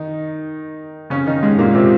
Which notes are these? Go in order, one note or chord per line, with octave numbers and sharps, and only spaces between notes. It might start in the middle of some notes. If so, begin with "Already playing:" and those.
Already playing: D#3 D#4
C#3 C#4
D#3 D#4
G#2 G#3
A#2 A#3
C3 C4